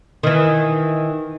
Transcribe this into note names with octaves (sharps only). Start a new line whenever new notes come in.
D#3 E3